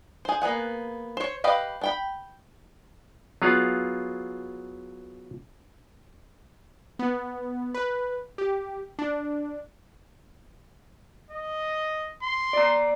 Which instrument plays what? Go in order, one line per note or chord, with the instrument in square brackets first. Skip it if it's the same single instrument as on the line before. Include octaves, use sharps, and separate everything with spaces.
[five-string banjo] G#4 C5
A#3 B3 G#4 F#5
C5 C#5
G4 B4 D#5 F5
D4 G5 B5
[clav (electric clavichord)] F#3 B3 F4 G#4 F5 F#5
[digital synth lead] B3
B4
G4
D4
[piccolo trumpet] D#5
C6
[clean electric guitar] D5 A#5